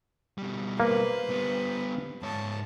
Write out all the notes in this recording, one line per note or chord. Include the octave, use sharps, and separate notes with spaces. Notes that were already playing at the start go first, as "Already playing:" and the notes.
B2 G3
A#3 B4 C5
G3 B3
G#2 C#5 A5